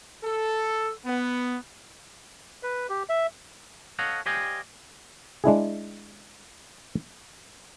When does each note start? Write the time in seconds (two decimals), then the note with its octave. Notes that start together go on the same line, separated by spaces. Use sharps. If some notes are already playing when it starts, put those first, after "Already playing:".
0.24 A4
1.06 B3
2.63 B4
2.89 G4
3.09 E5
3.99 A4 C#5 D#5 F5 F#5
4.26 G4 C5 D5 D#5 F5 G#5
5.44 G#3 D4 E4 G#4